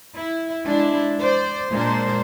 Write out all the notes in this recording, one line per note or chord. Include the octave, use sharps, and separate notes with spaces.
E4
G#3 D4 E4
C5 D5
A#2 G#3 A#3 D4 C5